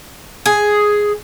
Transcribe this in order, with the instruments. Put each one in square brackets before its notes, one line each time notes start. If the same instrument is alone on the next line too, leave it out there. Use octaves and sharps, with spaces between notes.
[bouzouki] G#4